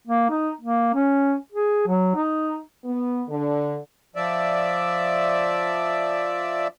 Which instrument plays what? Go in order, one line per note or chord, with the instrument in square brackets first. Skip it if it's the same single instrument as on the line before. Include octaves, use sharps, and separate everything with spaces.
[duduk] A#3
D#4
A#3
C#4
G#4
F#3
D#4
[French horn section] B3
D3
[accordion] F3 D5 E5